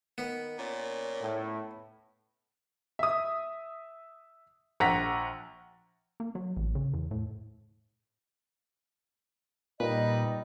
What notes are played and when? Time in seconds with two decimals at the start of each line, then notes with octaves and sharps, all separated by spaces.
0.18 D#3 B3
0.59 A#2 C#4
1.21 A2
2.99 E5 D#6
4.80 A#1 F#5 A#5 A#6 B6
6.20 A#3
6.35 F#3
6.57 A1
6.75 C#3
6.94 E2
7.11 A2
9.80 A#2 G3 D#4 B4 D#5